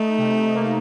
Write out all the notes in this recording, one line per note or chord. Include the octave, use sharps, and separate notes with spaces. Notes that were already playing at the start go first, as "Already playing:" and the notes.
Already playing: A3 D#4
C3
A#3